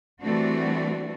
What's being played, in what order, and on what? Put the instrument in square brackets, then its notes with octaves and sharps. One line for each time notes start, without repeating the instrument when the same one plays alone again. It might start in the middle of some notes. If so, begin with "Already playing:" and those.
[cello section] E3 G3 A3 C4 D4 F#4